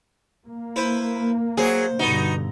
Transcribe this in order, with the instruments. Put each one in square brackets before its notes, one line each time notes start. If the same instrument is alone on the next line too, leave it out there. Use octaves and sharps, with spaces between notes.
[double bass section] A#3
[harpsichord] E4 B4 C5
[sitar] F#3 G#4 [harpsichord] C5
[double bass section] G2 B2 D3 [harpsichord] B3 F#4 [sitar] D#4